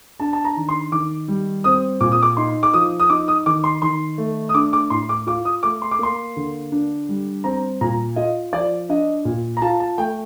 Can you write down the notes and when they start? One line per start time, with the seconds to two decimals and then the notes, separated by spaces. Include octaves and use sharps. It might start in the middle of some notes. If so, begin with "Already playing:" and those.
0.20 D4 A5
0.33 A5
0.45 A#5
0.57 D#3
0.69 C6
0.92 D#3 D6
1.28 G3
1.64 C4 D#6
2.01 A#2 D6
2.12 D#6
2.22 D6
2.37 D#4 C6
2.63 D6
2.73 F3 D#6
3.00 D#6
3.10 D#4 D6
3.28 D#6
3.46 D#3 D6
3.64 C6
3.82 D#3 C6
4.18 A3
4.49 D#6
4.54 D4 D6
4.73 D6
4.90 A2 C6
5.09 D6
5.27 F4 D6
5.45 D#6
5.63 A3 D6
5.82 C6
5.91 D6
5.99 A#3 C6
6.36 D3
6.72 D4
7.09 G3
7.44 C4 A#5
7.81 A#2 A#5
8.16 F4 D#5
8.53 F3 D5
8.89 D4 D#5
9.25 A#2
9.57 A#5
9.62 F4 A5
9.80 A5
9.98 A3 G5